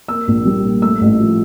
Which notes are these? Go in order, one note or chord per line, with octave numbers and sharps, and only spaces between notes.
A#3 E6
A#1
G3
A#2
A3 E6
A1
F3